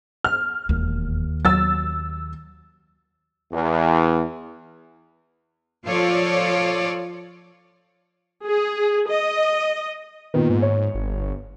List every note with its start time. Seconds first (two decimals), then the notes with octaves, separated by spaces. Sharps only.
0.24 F6
0.69 E1 D#2
1.45 F#3 E6 A6
3.51 E2
5.85 F3 F4 A4 C#5 D5
8.44 G#4
9.09 D#5
10.34 A#2 D#3 B3
10.50 G#2
10.62 C#5
10.95 G1